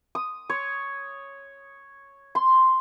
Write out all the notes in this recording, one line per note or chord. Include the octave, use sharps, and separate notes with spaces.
D#6
C#5
C6